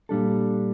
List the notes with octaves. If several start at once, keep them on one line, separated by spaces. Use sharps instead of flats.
A#2 G3 D4 A4